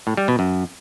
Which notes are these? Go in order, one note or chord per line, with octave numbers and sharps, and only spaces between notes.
A2
G3
B2
F#2